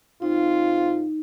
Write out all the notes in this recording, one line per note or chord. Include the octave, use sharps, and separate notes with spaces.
G#2 C4 D#4 F4